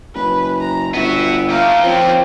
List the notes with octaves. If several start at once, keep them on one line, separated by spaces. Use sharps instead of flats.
F#1 B4
A#5
G1 B3 F#4 E5
A3 A#3 G4 F5 A#5
F3 C4 C#4